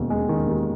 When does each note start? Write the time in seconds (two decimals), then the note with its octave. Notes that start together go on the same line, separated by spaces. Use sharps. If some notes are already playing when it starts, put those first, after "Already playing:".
Already playing: E1 D#2 D#3
0.10 G#3
0.29 D#3
0.47 D#2